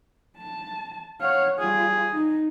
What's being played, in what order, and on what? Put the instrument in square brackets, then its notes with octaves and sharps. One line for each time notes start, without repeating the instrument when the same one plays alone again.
[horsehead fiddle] A5
[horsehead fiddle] C#5 F#5 [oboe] F5
[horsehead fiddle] G3 F4 [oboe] G#4
[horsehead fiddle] D#4